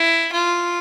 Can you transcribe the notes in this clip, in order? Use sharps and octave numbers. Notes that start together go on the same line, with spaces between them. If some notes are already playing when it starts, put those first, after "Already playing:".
Already playing: E4
F4